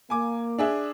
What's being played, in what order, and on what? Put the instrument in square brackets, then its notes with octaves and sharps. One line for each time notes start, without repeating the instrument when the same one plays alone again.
[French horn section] A#3 [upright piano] G#5 D6
[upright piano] D4 G#4 E5